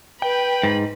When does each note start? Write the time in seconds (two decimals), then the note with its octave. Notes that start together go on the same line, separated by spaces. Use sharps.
0.22 B4 G5
0.63 G#2